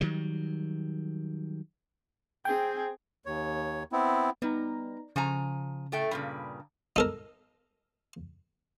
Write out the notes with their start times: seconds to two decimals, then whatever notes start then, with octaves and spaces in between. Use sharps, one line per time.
0.01 D#3 F#3 G3
2.45 C4 G#4 G5
3.26 D#2 C#5
3.92 B3 C4 E4
4.42 G3 B3 D#4 A#5
5.16 C#3 F3 G#5 A#5
5.92 A2 A3 G5
6.11 G2 A#2 C#3 B5
6.96 D#4 A4 A#4